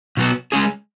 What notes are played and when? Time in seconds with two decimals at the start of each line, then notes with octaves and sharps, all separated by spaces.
0.17 B2 F#3 B3 F#4
0.52 G#3 C#4 G#4